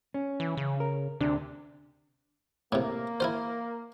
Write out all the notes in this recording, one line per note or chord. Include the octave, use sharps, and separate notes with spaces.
C#4
E3
C#3
A#4
D2 C3 D4
A2 C3 A#3
E4 F4 C5